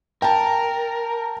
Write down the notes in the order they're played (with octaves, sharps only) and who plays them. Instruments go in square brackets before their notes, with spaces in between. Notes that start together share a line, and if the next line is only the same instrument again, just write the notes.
[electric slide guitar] A#4 [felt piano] G5 A5